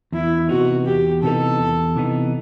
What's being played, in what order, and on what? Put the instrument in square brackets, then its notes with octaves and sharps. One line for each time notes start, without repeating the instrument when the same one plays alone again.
[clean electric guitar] E2 [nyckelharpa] E4
[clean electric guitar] C3 E3 B3 D#4 [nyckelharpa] F#4
[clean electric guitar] E2 [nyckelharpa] G4
[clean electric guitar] C3 E3 B3 D#4 [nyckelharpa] A4
[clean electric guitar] E2
C3 E3 B3 D#4